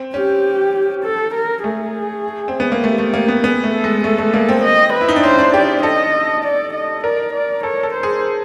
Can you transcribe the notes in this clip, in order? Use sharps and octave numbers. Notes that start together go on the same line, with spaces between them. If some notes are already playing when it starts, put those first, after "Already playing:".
Already playing: C4
C#4 G4
A4
A#4
A3 G#4
C4
B3
A#3
A3 G4
A3
A#3
B3
B3 G#4
A3
A4
G#3
A3 A4
A3
A#3
C4
D#5
B4
E4
D#4
D4
C#4 C5
D4
G4 D5
A4 D#5
D5
D#5
A#4 D5
D5
A4 C#5
A4
C5
G#4